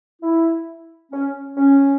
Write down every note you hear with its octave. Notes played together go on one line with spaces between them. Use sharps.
E4
C#4
C#4